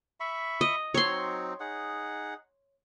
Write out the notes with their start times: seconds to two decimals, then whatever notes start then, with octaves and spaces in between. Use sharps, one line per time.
0.20 E5 B5 C#6
0.61 D#5
0.94 F#3 C4 D#4 C#5 C6
1.60 D#4 G#4 F#5